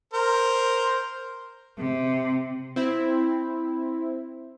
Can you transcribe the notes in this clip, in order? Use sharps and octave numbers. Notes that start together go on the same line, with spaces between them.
A#4 C5
C3
C4 E4